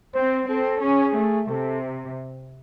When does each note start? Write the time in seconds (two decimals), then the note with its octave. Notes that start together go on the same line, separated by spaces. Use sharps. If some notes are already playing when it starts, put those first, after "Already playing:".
0.15 C4 C5
0.48 C4 A4
0.82 C#4 G#4
1.16 A3
1.50 C3 A4